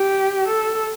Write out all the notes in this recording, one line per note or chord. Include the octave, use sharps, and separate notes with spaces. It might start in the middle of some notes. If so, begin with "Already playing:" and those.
Already playing: G4
A4